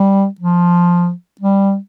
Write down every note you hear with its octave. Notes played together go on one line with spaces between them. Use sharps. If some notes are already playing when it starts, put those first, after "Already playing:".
Already playing: G3
F3
G3